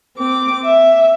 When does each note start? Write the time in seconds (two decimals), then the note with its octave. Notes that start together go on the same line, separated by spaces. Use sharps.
0.17 C4 D6
0.64 E5